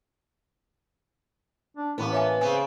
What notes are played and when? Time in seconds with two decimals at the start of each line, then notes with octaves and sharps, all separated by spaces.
1.77 D4
1.98 A1 A2 A#3 B3
2.13 C#5 E5 G#5
2.41 C#3 B3 C4 G#5